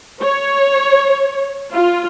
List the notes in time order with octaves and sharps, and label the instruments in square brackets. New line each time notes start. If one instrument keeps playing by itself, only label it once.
[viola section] C#5
F4